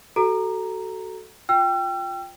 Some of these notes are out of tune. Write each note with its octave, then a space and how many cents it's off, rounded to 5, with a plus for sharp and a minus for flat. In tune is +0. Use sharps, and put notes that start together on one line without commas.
F#4 +25 A4 +0 A#5 +0
F4 +10 G5 +0 E6 +45